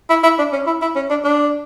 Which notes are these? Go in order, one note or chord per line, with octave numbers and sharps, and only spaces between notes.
E4
E4
D4
C#4
E4
E4
C#4
D4
D4